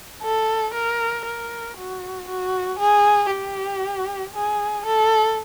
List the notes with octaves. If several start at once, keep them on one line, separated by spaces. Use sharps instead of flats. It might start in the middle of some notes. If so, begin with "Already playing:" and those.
A4
A#4
A#4
F#4
F#4
G#4
G4
G#4
A4